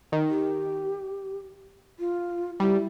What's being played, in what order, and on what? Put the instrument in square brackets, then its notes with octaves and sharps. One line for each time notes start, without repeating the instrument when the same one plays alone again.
[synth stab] D#3
[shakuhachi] G4
F4
[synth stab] G3 [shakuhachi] E4